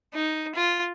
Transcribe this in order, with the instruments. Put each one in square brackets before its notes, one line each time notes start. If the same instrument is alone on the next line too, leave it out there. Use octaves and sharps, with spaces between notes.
[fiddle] D#4
F4